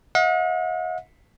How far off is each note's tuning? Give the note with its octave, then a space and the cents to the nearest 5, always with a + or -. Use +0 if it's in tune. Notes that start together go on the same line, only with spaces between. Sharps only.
D#5 +45 F#5 -45